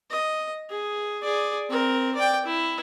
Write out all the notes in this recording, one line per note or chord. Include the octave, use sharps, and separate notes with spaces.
D#5
G#4
G#4 D5
C4 A#4
D5 G5
E4